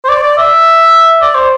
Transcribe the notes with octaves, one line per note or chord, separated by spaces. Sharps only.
C5
D5
D5
E5
D5
C5